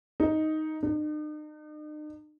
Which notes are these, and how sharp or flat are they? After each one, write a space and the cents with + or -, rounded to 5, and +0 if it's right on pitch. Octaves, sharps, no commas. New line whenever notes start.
D#4 +5
D#4 -45